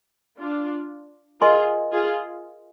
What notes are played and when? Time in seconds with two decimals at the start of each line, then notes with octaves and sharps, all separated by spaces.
0.38 D4 F4
1.41 F4 G#4 A#4 D#5 G#5 C6
1.92 F4 G#4